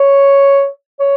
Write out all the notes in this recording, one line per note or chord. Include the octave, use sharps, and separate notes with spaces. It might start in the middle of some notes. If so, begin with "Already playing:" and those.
Already playing: C#5
C#5